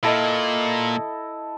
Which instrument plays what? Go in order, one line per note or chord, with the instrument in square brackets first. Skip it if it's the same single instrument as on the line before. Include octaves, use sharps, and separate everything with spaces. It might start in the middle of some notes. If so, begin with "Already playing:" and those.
[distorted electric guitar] A#2 [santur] E4 A4 D#5